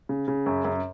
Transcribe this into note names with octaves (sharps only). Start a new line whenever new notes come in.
C#3
C#3
F#2
F#2